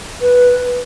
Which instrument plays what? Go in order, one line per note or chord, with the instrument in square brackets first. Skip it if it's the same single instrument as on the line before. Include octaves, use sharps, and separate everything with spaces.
[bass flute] B4